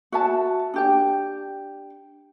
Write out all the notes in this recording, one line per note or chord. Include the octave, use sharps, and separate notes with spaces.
F#4 E5 A5
D4 G4 G5